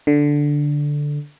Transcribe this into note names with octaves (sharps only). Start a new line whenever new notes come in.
D3